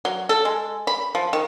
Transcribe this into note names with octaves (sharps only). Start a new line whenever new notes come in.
F#3
A4
G#3
B5
F3
D#3